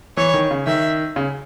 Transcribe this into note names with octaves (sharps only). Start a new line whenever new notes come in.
E3 C#5
D#3
C#3
D#3 E5
C#3